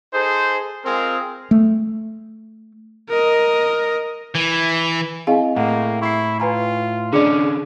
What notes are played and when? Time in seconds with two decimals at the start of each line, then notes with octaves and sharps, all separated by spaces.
0.14 D#4 G#4 A4 C5
0.85 G#3 C4 F4 G#4 A#4
1.51 A3
3.09 A#4 D#5
4.35 E3
5.27 C4 E4 G#4 D#5 F5 G#5
5.56 A2 A#3 F#5
6.02 E4 C#6 C7
6.40 F4 B4 G#5 A#5
7.13 D3 C#4 D4 G#4 D5 D#5 D6 C#7